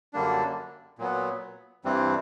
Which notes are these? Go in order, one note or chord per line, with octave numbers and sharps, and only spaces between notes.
F#2 D3 G3 A#3 D4
A#2 F#3 B3
G2 E3 G3 C4